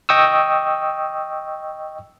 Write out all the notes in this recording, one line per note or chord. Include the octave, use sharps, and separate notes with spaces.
D#5 G5 C#6 D#6 E6